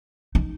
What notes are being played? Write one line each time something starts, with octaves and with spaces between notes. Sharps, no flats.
D#4